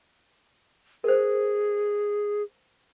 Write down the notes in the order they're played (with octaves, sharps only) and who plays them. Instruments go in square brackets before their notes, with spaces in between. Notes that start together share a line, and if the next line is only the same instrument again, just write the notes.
[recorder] G#4 [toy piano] A#4 C5